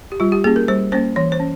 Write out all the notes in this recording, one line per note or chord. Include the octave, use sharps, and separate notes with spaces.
G4
G3 F4
G4
A#3 C#4 G#4
A#4
G3 C5
A#3 C#4 C5
E3 C#5
C5
C#4